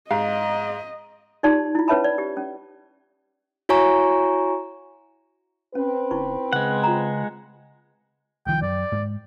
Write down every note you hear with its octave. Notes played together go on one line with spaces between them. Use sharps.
G#2 D#5 F5
D#4 F4 G4 D5 A5 C6
E4 F4
C#4 B4 C#5 E5 A5 B5
D5
G4
C#4
E4 F#4 C#5 G#5 A#5 C#6
C4 C#4 B4
G1 D#4 E4 C#6
C#3 G#3 F#5
F4 A#5
C2 D#3 F3 G5
F#2 D5
G#2